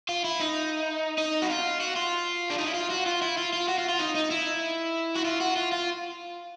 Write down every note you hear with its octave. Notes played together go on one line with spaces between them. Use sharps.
F4
E4
D#4
D#4
F#4
F4
F#4
F4
D4
D#4
E4
F4
F#4
F4
E4
F4
F4
F#4
F4
F4
D#4
D#4
E4
F#4
F4
F#4
F4
F4